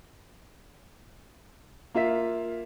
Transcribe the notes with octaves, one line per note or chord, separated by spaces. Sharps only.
A#3 F4 E5 B6